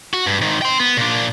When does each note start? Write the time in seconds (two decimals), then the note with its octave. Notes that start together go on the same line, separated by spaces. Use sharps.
0.14 F#4
0.26 G2
0.41 G#2 D#3
0.62 G5 C6
0.80 B3
0.97 A#2 D4